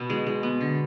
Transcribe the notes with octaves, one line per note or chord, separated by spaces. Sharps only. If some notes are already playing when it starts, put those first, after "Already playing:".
Already playing: B2 B3
G#3
G#3
B3
D3